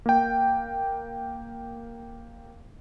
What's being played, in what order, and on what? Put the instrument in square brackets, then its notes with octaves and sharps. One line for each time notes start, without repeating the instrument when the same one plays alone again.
[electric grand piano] A#3 G5